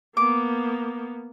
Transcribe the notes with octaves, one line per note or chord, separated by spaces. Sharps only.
A#3 B3 D6